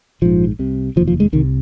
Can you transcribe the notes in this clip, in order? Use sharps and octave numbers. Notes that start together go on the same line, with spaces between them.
A#1 G#2 F3
C2 C3
F1 D#2 F3
F3
G#3
C2 C3 D#3